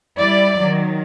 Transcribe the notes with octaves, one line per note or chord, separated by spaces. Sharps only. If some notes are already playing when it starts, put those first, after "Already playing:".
G3 E4 D5
D#3 F#3